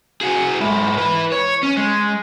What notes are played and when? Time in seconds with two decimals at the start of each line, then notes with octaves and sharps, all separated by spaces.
0.21 F#4 G#4
0.60 G#2 E4
0.97 E4 B4
1.32 C#5
1.63 C#4
1.77 G#3